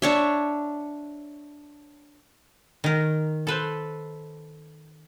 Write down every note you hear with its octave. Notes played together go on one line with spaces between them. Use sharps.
D4 C#5 E5
D#3 A#4
A4 B4 C5